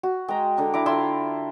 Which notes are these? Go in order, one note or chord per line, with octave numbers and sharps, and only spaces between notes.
F#4
G#3 G5 A#5
D3 D4 A#4
E4 A#5 D6
D3 E4 F4 C6 E6